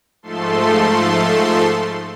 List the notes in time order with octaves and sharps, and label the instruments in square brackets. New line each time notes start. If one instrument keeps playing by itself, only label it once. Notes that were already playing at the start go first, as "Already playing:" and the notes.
[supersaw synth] G#2 F3 A3 A4 C6